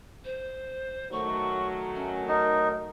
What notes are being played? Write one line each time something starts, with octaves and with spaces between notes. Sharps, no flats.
C5
D#3 F#3 A3 C#6
C#4
D#4 A#4